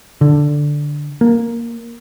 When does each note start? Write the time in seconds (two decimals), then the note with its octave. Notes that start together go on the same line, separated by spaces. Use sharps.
0.21 D3
1.21 A#3